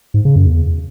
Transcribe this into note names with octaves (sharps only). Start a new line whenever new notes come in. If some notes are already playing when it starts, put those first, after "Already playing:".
G#2
C#3
F#2
E2